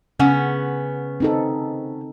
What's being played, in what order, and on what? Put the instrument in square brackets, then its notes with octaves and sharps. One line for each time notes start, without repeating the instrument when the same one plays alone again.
[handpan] C#3 [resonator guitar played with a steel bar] B3 C#4 F#5
[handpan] C4 D#4 A4